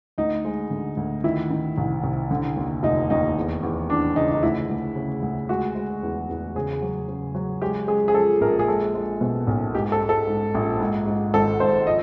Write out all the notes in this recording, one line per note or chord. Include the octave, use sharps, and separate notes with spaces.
D2 D#4
G#3
D3
D2
D#3 E4
D#3
C2
C2
D3
D#2
F1 D#4
D#2 D#4
E2
E2
E3 D4
C#3 D#4
D#4
D2 E4
D2
C#3
D2
G#3 F#4
G#3
E2
E2
C#3 G#4
F#3
C#3
F#3
G#3 G4
G#3 G#4
G#4
F3 A4
A#1 A#4
G#4
G#3 A4
G#3
B2
B1
G#2 G4
A4
G#3
A4
G#2
A#1
G#2
G#2
G#1 A4
G#1 C5
F3 D#5